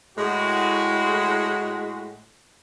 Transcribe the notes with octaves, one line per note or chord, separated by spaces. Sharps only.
A2 G#3 F#4